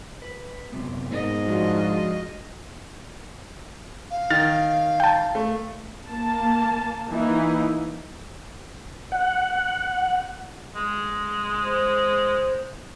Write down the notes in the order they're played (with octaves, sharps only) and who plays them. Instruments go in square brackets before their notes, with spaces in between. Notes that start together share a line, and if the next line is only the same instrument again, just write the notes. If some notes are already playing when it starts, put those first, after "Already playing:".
[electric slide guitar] B4
F#2 C3 B3
[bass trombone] G#2 [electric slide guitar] A#3 B3 [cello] D#5
[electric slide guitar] F3 G#3 D4 [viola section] F4 F#4
[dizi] F5
[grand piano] D#3 [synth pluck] F6 A6
[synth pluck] G5 A5
[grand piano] A3
[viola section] A#3 A5
E3 A#3 D#4 E4
[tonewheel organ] F#5
[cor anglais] G#3
[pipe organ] C5